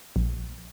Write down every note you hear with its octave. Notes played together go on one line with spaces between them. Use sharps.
A#1